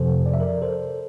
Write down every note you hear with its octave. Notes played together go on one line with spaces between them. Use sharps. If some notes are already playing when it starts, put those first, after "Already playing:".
Already playing: F2 C3 F3 A4 C5
D5
E5
A#4 D5
A4 C5